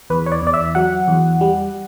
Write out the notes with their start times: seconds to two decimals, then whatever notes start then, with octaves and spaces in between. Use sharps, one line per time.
0.10 E2 B4
0.26 C#5
0.32 D5
0.42 E2 D5
0.54 E5
0.75 F#3 F#5
1.08 E2
1.41 G3